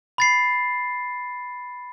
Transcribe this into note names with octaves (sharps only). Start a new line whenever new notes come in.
B5 A6 C7